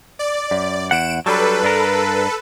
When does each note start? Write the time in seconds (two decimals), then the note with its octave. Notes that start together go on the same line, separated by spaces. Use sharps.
0.19 D5
0.51 F#2
0.91 E2 F#5 D7 E7
1.26 F#3 G3 D4 A4 B4
1.63 G2 D4 A#4